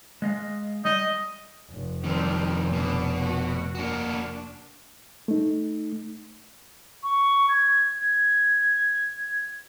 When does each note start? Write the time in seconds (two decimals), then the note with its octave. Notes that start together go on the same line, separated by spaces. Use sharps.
0.22 G#3 D#5 F5
0.85 G3 D#5
1.70 F1
2.04 F2 D#3 G3 C4 G4
2.72 B2 D4
3.18 A3 F#4
3.75 A#3 D4 F#4
5.28 A3 D#4
7.03 C#6
7.49 G#6
7.99 G#6